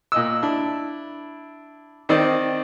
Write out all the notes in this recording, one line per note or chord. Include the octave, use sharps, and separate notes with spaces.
A#2 D#5 E6
D4 E4
D#3 C4 D5 D#5